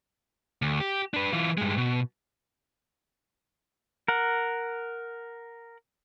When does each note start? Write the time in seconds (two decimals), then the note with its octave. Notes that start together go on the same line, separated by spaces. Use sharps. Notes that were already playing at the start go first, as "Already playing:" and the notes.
0.62 D2
0.80 G4
1.14 D4 B4
1.33 E3 F4
1.58 G2 G#3
1.77 B2
4.08 A#4 F#5